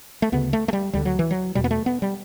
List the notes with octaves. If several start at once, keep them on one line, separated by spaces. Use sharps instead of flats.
A3
D2 C#3 B3
A3
A3
G3
D2 D3 G3
F#3
E3
F#3
E2 B2 G3
B3
A3
B3
G3